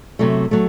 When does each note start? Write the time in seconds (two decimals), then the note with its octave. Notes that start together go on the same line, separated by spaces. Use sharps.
0.19 C3 F#3 A3
0.51 F#3 A3